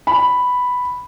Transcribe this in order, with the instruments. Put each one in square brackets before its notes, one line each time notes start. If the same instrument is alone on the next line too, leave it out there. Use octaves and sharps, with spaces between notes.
[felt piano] B5